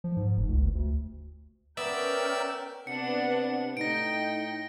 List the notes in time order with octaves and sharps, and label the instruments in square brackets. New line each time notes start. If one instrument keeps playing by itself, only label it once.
[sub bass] F3
G#2
F1
C#2
F#1
D2
[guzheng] B3 [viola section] C#4 A#4 G5 [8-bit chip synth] D5 E5 E6
[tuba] C3 [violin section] B3 D4 F#5 [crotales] C#7
[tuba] A2 [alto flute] D#4 [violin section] G5 [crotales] A#6 D7